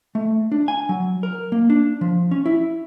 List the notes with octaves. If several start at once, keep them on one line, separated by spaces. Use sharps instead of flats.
A3
D4
G#5
F#3
A#4
A#3
D4
F3
C#4
E4